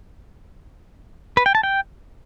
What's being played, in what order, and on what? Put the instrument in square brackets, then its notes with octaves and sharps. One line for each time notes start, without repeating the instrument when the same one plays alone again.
[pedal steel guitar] B4
G5
A5
G5